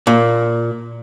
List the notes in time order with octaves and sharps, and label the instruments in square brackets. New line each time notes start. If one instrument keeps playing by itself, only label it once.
[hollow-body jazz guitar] A#2